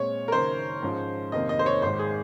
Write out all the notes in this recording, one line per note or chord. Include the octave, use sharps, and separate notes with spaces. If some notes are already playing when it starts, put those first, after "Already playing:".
Already playing: A#2 G#3 C4 C#5
A#4
F#1 F#2 D#3 C5
G#2 F3 G#3 C#4 F4
F1 F2 D#3 A#3 D#5
D#5
C5
C#5
G#1 G#2 D#3 C5
G#4